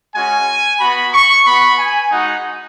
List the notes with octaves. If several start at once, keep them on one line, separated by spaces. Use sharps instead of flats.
G#3 C#4 F#4 G#5
B3 F#4 B5
C#6
B3 F#4 B5
G#5
G#3 D#4 F#4 F#5